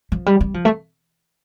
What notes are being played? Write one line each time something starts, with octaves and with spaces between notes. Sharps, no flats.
F3
G3
G3
F3
A3